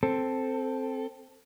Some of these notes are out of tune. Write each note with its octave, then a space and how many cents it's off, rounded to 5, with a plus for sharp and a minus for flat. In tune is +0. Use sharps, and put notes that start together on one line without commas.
C4 +0 A4 +0